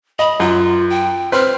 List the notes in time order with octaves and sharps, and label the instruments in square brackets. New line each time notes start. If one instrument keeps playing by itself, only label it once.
[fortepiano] D#5 [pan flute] B5
[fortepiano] F#2 [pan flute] F4
[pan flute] G5
[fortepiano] C4 B4 [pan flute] F6